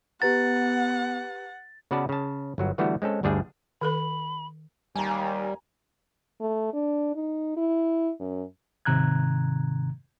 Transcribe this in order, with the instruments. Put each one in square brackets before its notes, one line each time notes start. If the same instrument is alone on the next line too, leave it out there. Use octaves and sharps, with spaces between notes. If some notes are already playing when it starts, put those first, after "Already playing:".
[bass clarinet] B3 [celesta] G4 B4 A#5 [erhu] F#5 [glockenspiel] A6
[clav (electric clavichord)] C#3 B3 F#4 B4 D5 A5
C#3 A5
G1 F#3 F#4
D3 E3 G3 A3 B3 F#4
G#3 C4 C#4 A4
G1 D2 G3 D4 G#4
[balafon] D#3 A4 B4 [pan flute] B5
[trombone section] D#2 [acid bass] G3 [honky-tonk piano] G#5 A#5
[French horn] A3
D4
D#4
E4
F#2
[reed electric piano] G#2 C3 D#3 A#5 F#6 G#6